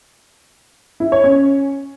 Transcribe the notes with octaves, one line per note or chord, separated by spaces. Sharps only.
E4
C#5
C#4